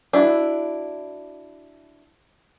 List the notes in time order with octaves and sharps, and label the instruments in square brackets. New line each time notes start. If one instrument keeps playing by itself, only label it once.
[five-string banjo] D4 E4 F#4